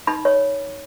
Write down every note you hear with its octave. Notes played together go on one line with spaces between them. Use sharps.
D#4 B5
C#5